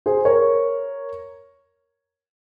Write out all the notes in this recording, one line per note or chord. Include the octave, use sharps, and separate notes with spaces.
G#4 C5
A#4 C#5